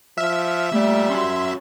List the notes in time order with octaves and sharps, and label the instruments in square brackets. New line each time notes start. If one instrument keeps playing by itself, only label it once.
[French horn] F3 [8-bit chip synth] E5 [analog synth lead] F6
[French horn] G3 [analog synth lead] A3 [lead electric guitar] A#3 D5
[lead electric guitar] C#4 F#4 [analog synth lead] C6